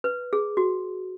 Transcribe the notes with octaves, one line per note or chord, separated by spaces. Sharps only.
B4
G#4
F#4